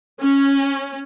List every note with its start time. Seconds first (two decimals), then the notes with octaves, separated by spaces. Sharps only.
0.21 C#4